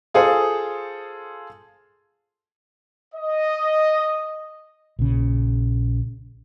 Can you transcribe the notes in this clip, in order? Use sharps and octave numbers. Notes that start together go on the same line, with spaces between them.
F4 G#4 A4 C5
D#5
A#1 C#3